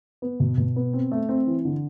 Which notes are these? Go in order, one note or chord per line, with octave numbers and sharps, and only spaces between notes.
B3
B2
B2
B3
C4
A3
C4
E3
D3